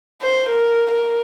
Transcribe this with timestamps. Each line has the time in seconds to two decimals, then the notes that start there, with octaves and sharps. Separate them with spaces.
0.22 C5
0.49 A#4
0.92 A#4